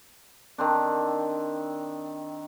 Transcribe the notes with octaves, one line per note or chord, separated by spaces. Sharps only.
D#3 C4 D4